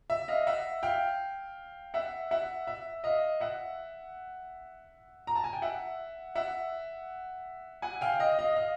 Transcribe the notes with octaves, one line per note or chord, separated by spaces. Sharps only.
E5
D#5 F5
E5 F#5
F5 G5
E5 F#5
E5 F#5
E5
D#5 F5
E5 F#5
A#5
A5
G#5
G5
E5 F#5
E5 F#5
F#5 G#5
F5 G5
D#5 F5
D#5 F5
D#5 F5